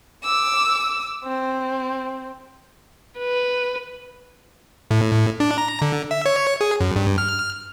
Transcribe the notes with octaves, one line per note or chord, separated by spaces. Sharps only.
D6 E6
C4
B4
A2
A2
D4
A#5
D3
E5
C#5
G#4
F#2
G2
F6